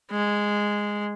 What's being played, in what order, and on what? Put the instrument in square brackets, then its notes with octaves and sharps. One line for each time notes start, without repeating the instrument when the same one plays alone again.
[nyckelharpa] G#3